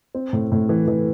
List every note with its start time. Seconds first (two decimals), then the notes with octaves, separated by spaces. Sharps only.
0.15 C4
0.33 A2
0.52 A2
0.69 E3
0.88 E3